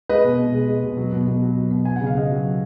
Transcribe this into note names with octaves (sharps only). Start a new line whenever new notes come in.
G#3 B4 D#5
B2
B2
G#3
G#3
B2
F#3
B2
B2
F#3
F#3
B2
F#3 G#5
C#3 F#5
F5
C#3 D#5 F#5
F#3
F#3